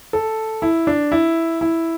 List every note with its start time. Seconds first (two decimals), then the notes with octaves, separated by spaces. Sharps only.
0.13 A4
0.62 E4
0.87 D4
1.12 E4
1.61 E4